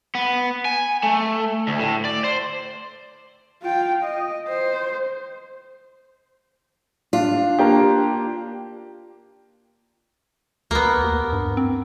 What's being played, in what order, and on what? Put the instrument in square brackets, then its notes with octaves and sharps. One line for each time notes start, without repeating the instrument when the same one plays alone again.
[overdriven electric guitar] B3
G#5
A3
D2
A2
D5
C5
[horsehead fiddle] F4 G5
D#5
C5
[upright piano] D4 [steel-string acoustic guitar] F4
[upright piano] A#3 D4 G4
[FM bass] D2 [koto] A#3 B3
[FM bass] D#2
G2
C4